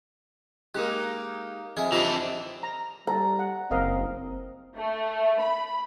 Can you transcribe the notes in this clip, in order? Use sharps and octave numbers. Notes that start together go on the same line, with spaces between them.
G#3 A#3 D#4 G4 A#4 F#6
F2 G#4 D#5 E5 G#5
E3 C4 D4 D#4 F4 G4 C5 D#5
A#5
G3 A4 A#5
F#5
F#1 C4 A#4 D#5 F5
A3
B5